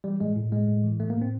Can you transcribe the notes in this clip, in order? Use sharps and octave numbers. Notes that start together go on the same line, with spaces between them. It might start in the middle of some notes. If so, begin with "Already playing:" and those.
E3 G3
A2 G#3
A2
A2 G#3
A2
E3
A2 A3
A#3
A2
C4